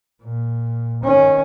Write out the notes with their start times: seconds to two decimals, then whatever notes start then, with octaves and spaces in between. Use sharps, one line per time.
0.23 A#2
1.04 D#3 C#4